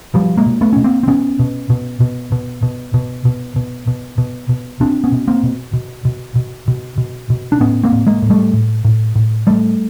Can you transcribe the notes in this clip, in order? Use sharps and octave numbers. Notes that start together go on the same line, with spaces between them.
B2 F3 G3
G#3 A#3
B2
A3 B3
B2 C#4
A#3 C4
C4
B2 B3 C#4
B2
B2
B2
B2
B2
B2
B2
B2
B2
B2
B2
B2 C4 D4
B3 C#4
B2
A#3 C4
B2
B2
B2
B2
B2
B2
B2
D4
A2 B3 C#4
A#3 C4
A2
G#3 A#3
A2
G3 A3
A2
A2
A2
A2 G3 A3